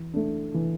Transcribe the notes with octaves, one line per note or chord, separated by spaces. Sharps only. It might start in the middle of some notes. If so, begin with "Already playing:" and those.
Already playing: E3
A3 D4
E3